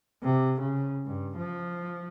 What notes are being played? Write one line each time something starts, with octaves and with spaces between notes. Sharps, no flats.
C3
C#3
G2
F3